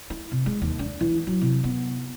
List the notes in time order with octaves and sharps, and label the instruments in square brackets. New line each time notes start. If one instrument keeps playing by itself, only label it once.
[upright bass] E4
C3
G#3
D#2
D4
E3
F#3
C3
B3